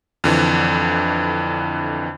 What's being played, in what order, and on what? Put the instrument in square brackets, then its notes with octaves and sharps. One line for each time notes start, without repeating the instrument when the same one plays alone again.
[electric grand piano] F2 D3 E3